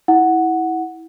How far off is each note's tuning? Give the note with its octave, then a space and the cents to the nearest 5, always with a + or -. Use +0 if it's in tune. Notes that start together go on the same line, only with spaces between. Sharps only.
E4 -20 F#5 +0